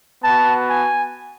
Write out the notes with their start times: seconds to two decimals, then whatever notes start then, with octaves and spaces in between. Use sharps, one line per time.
0.23 B3 F#4 A5
0.70 G#5